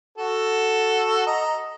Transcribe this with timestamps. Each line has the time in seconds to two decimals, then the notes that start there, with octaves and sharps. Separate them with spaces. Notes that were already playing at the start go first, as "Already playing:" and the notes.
0.18 F#4 A4
1.26 D#5 A#5